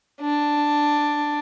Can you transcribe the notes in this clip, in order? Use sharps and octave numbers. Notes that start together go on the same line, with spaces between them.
D4